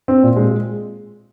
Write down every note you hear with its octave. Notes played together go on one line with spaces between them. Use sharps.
C4
A#2
G#3